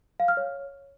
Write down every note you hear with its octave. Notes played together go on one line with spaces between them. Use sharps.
F5
F6
C#5